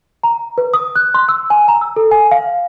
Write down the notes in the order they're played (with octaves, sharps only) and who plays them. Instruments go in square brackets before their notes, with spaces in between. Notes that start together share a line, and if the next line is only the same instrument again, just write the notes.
[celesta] A#5
B4
D#6
F#6
C6
E6
G#5
A#5
E6
A4
G#5
F5